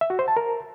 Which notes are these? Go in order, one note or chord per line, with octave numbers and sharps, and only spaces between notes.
E5
F#4
C5
A5
A#4